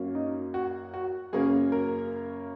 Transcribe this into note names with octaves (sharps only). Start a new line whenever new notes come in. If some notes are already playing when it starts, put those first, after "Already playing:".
Already playing: F#2 F#3 A#3 C#4
D#4
F#4
F#4
F#2 C#3 A#3 C#4 G#4
A#4